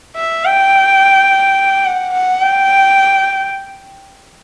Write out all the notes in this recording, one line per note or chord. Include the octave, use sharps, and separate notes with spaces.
E5
G5
F#5
F#5
G5